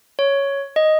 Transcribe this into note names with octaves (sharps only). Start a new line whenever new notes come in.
C#5
D#5